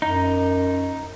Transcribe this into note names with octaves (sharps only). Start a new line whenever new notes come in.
F#2 D#4